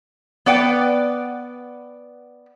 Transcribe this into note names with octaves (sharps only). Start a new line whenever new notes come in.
B3 B4 D5 F#5 G5